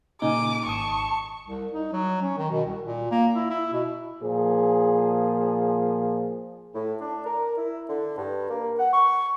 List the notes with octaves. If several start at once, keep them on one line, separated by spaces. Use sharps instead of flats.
A#2 C#3 D#4 G#5 D6
G#1 A5 C#6 D#6
C2
D#4
F#3
C#4
D#3
B2
C2
A#2
A#3
E4
E4
B2
A#2 F3 G#4
A2
D4
A#4
E4
D3
G2
A#3
F#5
C#6